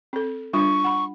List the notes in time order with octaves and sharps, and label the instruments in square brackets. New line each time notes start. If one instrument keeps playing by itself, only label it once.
[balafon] C4 A4
[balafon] G3 D4 F4 [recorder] C#6
[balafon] F#5 B5